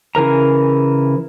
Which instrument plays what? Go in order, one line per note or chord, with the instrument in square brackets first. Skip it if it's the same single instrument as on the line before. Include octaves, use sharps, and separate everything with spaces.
[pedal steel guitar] C#3 E3 A#4 A#5